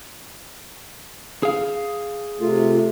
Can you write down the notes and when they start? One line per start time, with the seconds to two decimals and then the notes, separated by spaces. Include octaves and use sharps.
1.43 G#4 F5
2.41 C3 A3 F4